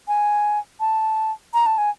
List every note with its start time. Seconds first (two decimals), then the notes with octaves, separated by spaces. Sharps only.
0.08 G#5
0.80 A5
1.54 A#5
1.66 A5
1.78 G#5